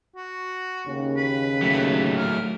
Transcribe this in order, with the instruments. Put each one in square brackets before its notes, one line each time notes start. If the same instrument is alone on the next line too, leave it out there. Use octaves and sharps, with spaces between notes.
[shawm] F#4
[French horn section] D#2 C#3
[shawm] B4
[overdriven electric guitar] F#3 A3
[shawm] A#4